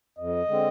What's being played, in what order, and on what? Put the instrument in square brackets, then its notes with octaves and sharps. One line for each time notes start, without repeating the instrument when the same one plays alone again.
[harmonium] F2 [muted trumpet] D#5
[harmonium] D3 G#3 C4